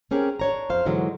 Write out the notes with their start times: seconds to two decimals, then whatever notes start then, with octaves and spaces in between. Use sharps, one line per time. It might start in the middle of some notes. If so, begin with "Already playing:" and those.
0.11 C4 C#4 G4 G#4 A#4
0.40 D4 C#5 A#5
0.69 F2 C5 F5
0.86 G#2 D3 E3 F#3 G#3